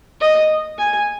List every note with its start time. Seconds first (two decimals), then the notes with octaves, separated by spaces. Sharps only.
0.21 D#5
0.78 G#5